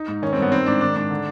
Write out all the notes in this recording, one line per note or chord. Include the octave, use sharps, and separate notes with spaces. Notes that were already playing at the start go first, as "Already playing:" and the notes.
Already playing: D#4
G#2
D#3 C#4
G2 C4
B3
D#3 C4
G#2 D4
D#3 D4
G#2 D4
D3